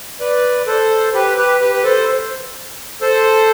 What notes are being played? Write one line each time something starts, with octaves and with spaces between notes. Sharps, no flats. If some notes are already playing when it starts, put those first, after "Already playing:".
B4 D5
A4 C5
G4 B4
G4 B4
G4 B4
B4
A4 C5
A4 C5